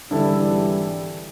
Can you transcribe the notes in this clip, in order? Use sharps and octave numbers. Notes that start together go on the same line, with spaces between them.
G#1 D3 E3 G3 E4 A4